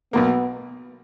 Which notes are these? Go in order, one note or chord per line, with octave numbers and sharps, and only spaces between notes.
B1 B2 A#3 B3